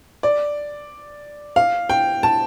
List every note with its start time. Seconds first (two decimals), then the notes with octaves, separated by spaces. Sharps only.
0.23 D5
1.56 F5
1.89 G5
2.23 A5